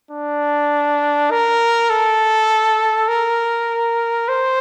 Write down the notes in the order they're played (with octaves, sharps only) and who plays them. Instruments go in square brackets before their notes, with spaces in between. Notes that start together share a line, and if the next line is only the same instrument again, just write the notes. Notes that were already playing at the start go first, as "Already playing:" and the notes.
[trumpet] D4
A#4
A4
A#4
C5